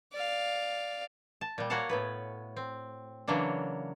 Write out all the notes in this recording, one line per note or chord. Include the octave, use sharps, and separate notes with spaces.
D5 F5
A5
A#2 G3
A#3 F#4 C#5 F5 F#5 A5
A2 B3 B4
C4
C#3 E3 F#3 A#3 D4